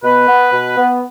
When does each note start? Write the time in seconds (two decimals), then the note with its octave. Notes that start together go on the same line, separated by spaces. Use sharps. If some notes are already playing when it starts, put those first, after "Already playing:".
0.04 B2 B4
0.28 B3
0.53 B2
0.77 B3